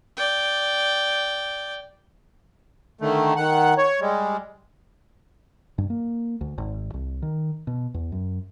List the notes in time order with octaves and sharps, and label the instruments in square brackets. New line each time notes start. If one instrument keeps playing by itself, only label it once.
[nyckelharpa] D5 G5
[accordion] D3 D#3 A3
D#3 F#5
C#5
G3 G#3
[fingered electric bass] G2
A#3
D2
G#1
C2
D#3
B2
E2
F#2